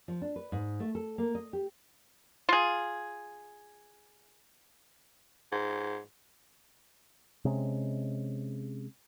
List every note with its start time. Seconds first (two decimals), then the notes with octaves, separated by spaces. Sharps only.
0.08 F3
0.22 D4
0.36 B4
0.52 G#2
0.80 A3
0.95 A4
1.18 A#3
1.35 D#5
1.53 G4
2.49 F4 G#4
5.52 G#2
7.45 C3 G#3 C#4